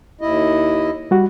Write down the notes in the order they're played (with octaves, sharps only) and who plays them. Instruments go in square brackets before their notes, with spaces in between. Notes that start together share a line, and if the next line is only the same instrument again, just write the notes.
[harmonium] D#2 E4 D#5
[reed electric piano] G3 F#4